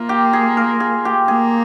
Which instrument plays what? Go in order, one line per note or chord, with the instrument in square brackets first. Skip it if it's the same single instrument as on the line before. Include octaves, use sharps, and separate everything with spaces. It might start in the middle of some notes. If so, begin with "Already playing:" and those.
Already playing: [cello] A#3 [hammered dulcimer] F4
[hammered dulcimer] G4
G#4
A#4
G#4
G4
[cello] A#3 [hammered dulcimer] G#4